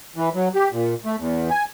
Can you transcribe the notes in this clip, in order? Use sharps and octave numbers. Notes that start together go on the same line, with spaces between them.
E3
F#3
G4
A#2
A3
E2
G#5